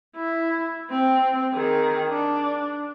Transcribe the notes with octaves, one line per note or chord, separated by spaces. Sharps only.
E4
C4
D#3 G#4
D4